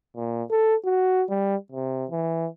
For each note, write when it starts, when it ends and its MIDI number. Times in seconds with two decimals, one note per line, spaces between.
0.16 0.43 46
0.51 0.75 69
0.85 1.24 66
1.29 1.55 55
1.72 2.05 48
2.11 2.47 52